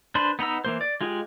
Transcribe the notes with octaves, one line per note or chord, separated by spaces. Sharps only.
D4 B4 C5
B3 D#4 A#5 E6
E3 A#3 C5
D5
G#3 F4 G4 G#4